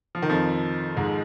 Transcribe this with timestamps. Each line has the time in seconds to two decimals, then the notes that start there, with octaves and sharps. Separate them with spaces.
0.15 F3
0.22 D#3
0.30 F2 F3
0.97 G#2 G#3